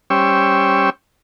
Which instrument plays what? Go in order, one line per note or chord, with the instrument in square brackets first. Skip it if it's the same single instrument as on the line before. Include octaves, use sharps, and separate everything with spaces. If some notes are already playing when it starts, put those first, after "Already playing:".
[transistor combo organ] G3 C#4 C5 G5 C#6 E6